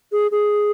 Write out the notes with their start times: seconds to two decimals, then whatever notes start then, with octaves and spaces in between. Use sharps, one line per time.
0.12 G#4
0.31 G#4